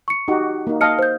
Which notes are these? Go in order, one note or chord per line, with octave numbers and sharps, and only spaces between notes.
C#6 C#7
D#4 F#4 G4
A#3 D#4
D#5 F5 A5 F6 C#7
C5 G6